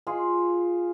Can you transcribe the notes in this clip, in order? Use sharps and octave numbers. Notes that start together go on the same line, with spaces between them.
F4 G#4